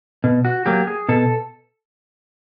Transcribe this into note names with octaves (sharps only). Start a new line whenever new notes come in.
B2
F#4
F#3 A#3 G4
G#4
B2 A4